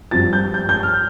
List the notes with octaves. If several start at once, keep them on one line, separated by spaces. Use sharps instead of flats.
G2 F3 C4 F4 A6
G6
G6
G6
F6